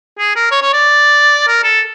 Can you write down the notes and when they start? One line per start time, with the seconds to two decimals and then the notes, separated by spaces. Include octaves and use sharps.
0.19 G#4
0.36 A#4
0.51 C#5
0.62 C#5
0.73 D5
1.48 A#4
1.64 A4